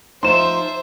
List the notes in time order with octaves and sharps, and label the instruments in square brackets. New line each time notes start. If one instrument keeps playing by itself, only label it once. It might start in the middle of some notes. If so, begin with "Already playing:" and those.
[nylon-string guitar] F3 D#4 [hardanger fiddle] C5 E5 [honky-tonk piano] C6 E7